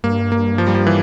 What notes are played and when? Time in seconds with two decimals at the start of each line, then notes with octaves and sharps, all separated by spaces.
0.04 G2 A#3
0.32 A#3
0.58 F3
0.67 G3
0.75 F3
0.87 E3